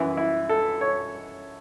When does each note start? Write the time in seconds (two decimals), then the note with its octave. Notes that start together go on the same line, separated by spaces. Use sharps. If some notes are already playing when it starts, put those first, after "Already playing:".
Already playing: F#2 E3 E4
0.17 E4
0.49 A4
0.81 C#5